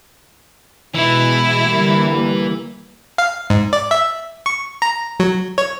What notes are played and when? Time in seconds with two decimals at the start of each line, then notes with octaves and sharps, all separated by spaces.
0.95 B2 E3 G#3 E4
1.67 D3 G3 A#3
3.18 F5
3.50 G#2
3.73 D5
3.91 E5
4.46 C#6
4.82 A#5
5.20 F#3
5.58 C#5